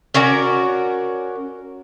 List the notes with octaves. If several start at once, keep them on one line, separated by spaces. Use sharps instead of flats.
C#4 F#4 A#4 D5